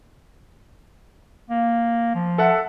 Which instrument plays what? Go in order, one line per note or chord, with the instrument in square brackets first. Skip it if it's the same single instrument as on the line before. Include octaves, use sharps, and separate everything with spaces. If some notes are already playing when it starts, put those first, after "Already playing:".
[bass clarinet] A#3
F3
[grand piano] A4 E5 F#5